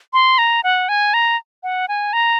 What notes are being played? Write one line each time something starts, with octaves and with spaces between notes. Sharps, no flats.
C6
A#5
F#5
G#5
A#5
F#5
G#5
A#5